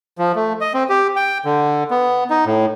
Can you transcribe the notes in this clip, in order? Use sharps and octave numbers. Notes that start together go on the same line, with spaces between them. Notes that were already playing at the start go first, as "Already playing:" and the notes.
F3
A3
D#5
C4
G4
G5
D3
B3
D#4
A2